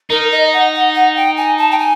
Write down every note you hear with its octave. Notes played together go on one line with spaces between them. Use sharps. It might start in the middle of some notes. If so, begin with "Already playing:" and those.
D#4 A#4
D#5
F#5
F#5
F#5
G5
G#5
A5
G5
G#5